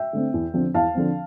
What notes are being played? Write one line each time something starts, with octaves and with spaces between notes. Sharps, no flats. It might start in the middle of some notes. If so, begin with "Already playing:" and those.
Already playing: E5 G5
D3 A3 C4
E2
D3 F3 C4
E2 F5 A5
D3 F3 C4